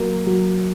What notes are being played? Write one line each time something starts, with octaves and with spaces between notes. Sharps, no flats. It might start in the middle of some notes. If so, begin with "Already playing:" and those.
Already playing: F#3 A#3
F#3